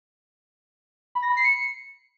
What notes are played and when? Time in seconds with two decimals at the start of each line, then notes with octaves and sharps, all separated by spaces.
1.15 B5
1.22 A#6
1.30 B5
1.37 C7
1.44 C#7